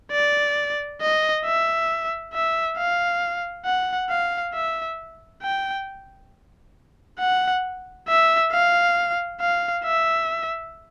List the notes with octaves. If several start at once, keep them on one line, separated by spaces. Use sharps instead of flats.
D5
D#5
E5
E5
F5
F#5
F5
E5
G5
F#5
E5
F5
F5
E5